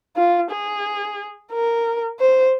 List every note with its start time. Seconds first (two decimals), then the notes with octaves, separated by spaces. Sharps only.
0.16 F4
0.51 G#4
1.52 A#4
2.20 C5